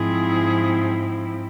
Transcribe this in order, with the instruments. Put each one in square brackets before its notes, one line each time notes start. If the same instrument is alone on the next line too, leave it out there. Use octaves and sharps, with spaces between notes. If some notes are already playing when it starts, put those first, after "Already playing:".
Already playing: [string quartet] G#2 F3 C4 E4 G#4